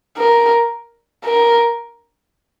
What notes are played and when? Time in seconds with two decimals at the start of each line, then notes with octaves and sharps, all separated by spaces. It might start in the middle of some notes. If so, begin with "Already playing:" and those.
0.18 A#4
1.25 A#4